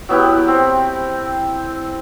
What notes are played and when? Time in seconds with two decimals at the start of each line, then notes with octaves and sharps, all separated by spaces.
0.09 F#3 B3 E4 G4
0.48 C4